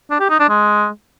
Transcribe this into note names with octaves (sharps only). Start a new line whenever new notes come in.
D4
G4
D#4
D4
G#3